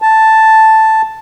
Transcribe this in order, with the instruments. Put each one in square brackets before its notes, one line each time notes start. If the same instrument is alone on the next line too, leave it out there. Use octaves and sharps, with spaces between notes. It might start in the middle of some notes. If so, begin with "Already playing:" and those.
[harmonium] A5